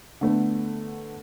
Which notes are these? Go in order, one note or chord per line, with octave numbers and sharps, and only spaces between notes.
D3 A3 B3